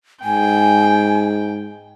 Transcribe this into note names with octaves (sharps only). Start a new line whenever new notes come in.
G#2 G5 G#5